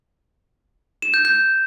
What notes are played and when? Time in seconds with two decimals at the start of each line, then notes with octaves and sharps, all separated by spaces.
1.02 E7
1.14 G6
1.25 G6